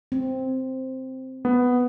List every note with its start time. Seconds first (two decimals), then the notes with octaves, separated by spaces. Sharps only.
0.12 C4
1.45 B3